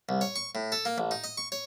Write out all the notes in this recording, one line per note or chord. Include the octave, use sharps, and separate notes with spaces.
C2
C#5
C#6
A2
A4
A#3
A1
D#4
D#5
C#6
C#5